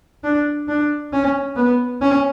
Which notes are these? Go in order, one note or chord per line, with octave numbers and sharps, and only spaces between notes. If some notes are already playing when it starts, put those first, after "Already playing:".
D4
D4
C#4
B3
C#4